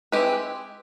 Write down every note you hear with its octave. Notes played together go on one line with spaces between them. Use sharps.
G#3 C4 E4 G4 B4